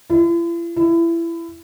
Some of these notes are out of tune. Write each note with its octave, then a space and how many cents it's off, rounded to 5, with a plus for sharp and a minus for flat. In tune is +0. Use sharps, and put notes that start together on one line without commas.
E4 +45
E4 +25